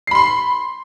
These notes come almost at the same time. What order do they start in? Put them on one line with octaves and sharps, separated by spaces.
C7 B5 C6